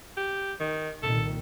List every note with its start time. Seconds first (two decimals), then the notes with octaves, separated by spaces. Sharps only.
0.17 G4
0.60 D#3
1.03 C2 A#2 D#3 A4